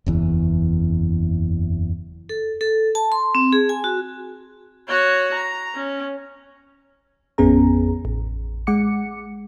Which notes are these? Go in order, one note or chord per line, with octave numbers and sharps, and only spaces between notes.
F#1 E2 E3
A4
A4
A5
C6
C4
G#4
G#5
F#4
F#4 C#5
A#5
C#4
A1 F2 B3 C#4 G#4 A#5
A1
G#3 F#5 D6 C#7